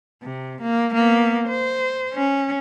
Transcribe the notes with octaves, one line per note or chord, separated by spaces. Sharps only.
C3
A#3
A#3 B3
C5
C#4